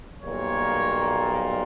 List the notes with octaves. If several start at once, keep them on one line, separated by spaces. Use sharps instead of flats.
B1 A#2 G3 A#3 C#5